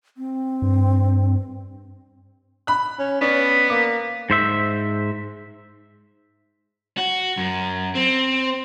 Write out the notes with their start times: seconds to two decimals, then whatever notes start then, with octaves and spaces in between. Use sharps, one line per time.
0.17 C4
0.62 G2
2.67 B5 F#6
2.99 C#4
3.21 B3 C#4 D5
3.70 A#3 D6
4.30 G#2 C5 E5
6.98 F#4
7.38 F#2
7.95 C4